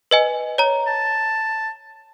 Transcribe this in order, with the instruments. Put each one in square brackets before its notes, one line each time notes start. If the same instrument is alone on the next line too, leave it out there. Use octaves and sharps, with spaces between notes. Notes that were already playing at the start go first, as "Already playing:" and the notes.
[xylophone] B4 D#5 G#5
C#5 A#5
[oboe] A5